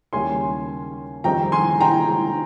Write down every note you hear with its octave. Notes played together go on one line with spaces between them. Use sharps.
D#2 C#3 G3 C#4 G#5 C6
F2 D#3 G3 C4 G5 A#5
G#5 C6
G5 A#5